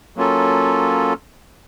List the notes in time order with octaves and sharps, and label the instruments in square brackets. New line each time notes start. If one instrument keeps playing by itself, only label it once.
[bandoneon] F#3 A#3 C#4 F4 A4